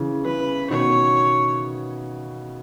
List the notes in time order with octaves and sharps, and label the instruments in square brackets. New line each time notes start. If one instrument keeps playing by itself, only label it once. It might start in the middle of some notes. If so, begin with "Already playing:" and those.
Already playing: [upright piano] C#3 E3
[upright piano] C#3 E3 [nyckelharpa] B4
[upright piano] B2 D#3 [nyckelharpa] C#5